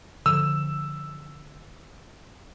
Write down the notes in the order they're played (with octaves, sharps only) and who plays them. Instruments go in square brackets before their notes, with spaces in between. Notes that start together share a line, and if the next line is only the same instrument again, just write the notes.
[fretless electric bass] D3 F3 [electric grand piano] E6